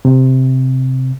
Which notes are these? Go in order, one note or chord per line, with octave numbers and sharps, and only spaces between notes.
C3